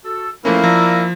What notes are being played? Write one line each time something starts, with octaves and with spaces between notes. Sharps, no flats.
F#4 A4
F3 A3 A#3 C#4 E4 B4 C5
F3 D5 A#5 E6